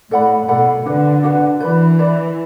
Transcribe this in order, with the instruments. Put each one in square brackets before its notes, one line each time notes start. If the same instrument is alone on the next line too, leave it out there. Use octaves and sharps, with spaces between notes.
[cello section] A2 [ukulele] A4 D5 F#5 B5
[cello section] B2 [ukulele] A4 D5 F#5 B5
[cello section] D3 [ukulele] D4 F#4 B4 F#5
[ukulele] D4 F#4 B4 F#5
[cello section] E3 [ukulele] B4 D5 B5
[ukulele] B4 D5 B5